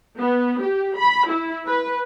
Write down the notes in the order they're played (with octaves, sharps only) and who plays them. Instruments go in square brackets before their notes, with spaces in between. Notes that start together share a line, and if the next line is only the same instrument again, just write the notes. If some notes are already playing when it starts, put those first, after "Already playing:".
[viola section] B3
G4
B5
E4
B4